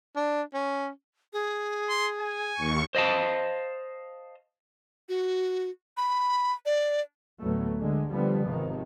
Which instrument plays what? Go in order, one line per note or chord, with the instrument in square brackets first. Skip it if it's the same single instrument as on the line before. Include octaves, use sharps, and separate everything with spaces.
[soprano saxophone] D4
C#4
[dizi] G#4
[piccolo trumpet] C6
G#5
[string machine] D#2 C#6
[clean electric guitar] C5 D#5 F5 A5
[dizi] F#4
B5
D5
[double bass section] D2 A2 F#3 A3 B3
D3 G#3
D3 F3 G3 B3
G#1 C3 D#3 F3